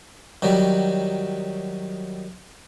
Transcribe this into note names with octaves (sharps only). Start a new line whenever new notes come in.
D#3 F#3 G3